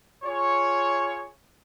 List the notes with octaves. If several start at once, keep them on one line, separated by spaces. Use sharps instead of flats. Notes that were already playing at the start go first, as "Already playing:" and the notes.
F4 G#4 C#5